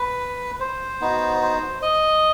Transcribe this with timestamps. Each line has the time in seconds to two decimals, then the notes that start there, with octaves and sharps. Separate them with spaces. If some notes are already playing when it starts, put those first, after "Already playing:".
Already playing: B4
0.60 C5
1.01 B3 D#4 F#4
1.42 C5
1.82 D#5